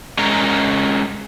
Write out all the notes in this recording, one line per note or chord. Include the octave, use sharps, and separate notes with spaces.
G#3 C#4 A#4 A#5